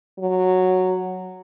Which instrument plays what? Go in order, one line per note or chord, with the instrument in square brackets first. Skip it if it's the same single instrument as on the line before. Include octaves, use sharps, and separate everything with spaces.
[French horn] F#3